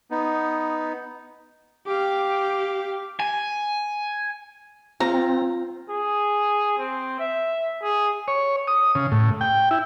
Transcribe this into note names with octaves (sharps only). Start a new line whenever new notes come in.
B3 D#4
G4 F5 D6
G#5
C4 F4 A#5
G#4
C4
E5
G#4
C#5
D#6
C#3
A2
G5
E4